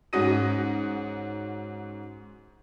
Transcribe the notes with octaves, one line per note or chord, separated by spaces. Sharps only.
G#2 C#4 F#4 D#6 A#6 D#7